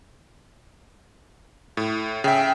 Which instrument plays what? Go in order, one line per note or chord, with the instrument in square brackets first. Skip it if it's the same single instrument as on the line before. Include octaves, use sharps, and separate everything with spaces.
[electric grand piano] A2
[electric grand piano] C#3 E5 [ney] G5